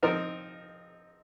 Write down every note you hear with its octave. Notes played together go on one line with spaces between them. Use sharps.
F3 C4 D#4 A#4